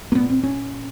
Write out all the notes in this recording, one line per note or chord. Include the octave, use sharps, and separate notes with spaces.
A#3
A#2 B3
C4
C#4